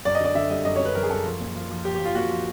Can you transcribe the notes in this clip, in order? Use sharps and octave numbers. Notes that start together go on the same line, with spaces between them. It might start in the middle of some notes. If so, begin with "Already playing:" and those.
F#2 D5
D#5
D3 D5
D3 E5
G3 D#5
F#2 D#5
C#5
D3
B4
F#2 A#4
G#4
F#2 A4
F3
A#2
F3
F3
F3 G4
G4
F3
F4
A#2 F#4
F3